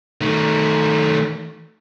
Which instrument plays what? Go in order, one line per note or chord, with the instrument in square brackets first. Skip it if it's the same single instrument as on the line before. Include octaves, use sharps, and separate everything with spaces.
[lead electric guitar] D#3 A3